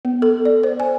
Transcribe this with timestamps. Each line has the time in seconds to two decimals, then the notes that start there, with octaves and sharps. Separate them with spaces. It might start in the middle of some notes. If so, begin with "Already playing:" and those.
0.05 B3
0.22 A4
0.45 D5
0.63 C5
0.80 G#5